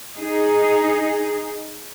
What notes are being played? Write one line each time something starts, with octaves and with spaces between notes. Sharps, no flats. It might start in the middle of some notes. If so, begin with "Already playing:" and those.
D#4 G#4